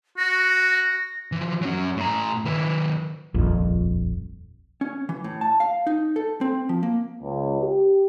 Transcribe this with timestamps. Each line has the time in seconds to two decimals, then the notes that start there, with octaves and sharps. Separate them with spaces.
0.18 F#4 A#6
1.32 E3 F3
1.62 F#3 C#4
1.96 A2 A#5
2.45 D#3 B4
3.34 D#1 A#1 F2
4.81 C#4
5.09 E3
5.24 A2
5.41 A5
5.60 F5
5.87 D#4
6.16 A4
6.41 C4
6.69 F3
6.83 A#3
7.22 C#2
7.61 G4